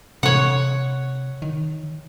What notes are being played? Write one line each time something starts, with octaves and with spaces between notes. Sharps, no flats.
C3 C#5 F#5
D#3